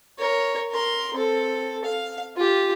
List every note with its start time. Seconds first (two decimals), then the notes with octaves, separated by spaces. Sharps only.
0.18 A#4 C#5
0.71 A#4 C6
1.14 C4 A4
1.84 F5
2.37 F4 G4